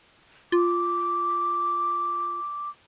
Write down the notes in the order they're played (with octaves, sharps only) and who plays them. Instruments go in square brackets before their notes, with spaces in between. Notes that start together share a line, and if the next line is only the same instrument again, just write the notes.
[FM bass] F4 [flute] D6